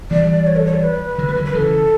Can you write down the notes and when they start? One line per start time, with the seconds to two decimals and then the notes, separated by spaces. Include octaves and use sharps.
0.11 E3 G3 D5
0.47 C#5
0.56 A4
0.65 C#5
0.74 D5
0.83 B4
1.18 D3 F#3
1.28 G3
1.36 D3 F#3
1.45 B4
1.54 C#3 E3 A4